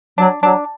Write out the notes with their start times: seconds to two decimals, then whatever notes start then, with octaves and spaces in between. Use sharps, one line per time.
0.18 F#3 D4
0.43 F#3 D4